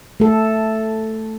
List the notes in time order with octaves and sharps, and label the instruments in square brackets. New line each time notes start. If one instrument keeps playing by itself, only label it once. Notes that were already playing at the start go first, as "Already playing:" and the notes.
[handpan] A3 A4